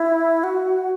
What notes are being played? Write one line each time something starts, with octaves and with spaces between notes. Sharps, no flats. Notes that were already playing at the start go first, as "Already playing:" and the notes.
Already playing: E4
F#4